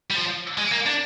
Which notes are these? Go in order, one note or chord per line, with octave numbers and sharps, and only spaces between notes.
G3
F3
G#3
A#3
D4